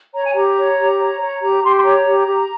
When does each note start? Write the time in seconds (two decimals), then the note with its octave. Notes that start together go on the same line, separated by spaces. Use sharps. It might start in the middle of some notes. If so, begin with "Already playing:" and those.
0.14 C#5 A#5
0.24 G#5
0.35 G4 A#5
0.57 C#5
0.77 G4
0.99 C#5
1.20 C#5
1.41 G4 A#5
1.63 G4 C6
1.76 C6
1.84 C#5 A#5
2.06 G4
2.27 G4